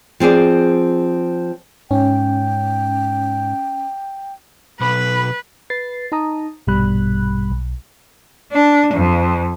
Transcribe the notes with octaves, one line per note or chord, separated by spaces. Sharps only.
F3 C4 G#4 D5
G#2 C#4 G5
B1 B4 B5
B4 A6 C7
D#4 A5 A#5 D#6
A#1 G2 B2 G3 B5 F#6
B1
D4
F2